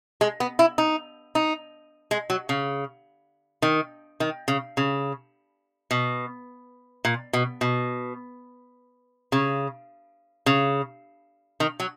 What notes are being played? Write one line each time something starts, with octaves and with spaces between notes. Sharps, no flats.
G#3
B3
E4
D#4
D#4
G#3
F#3
C#3
D#3
D#3
C#3
C#3
B2
A#2
B2
B2
C#3
C#3
D#3
F#3